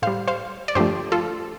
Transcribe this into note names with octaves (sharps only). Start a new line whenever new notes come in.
A2 G3 C5 F5
C5 F5
D5
G2 D3 F3 A3 G4 C5
F4 A4